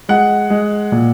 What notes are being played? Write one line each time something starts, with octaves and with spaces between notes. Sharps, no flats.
G#3 F#5
G#3
A#2